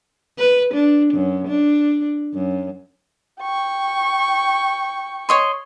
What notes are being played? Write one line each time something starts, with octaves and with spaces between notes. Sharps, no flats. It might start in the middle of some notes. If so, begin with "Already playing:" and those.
B4
D4
F#2
D4
F#2
G5 C#6
C#5 D#5 C6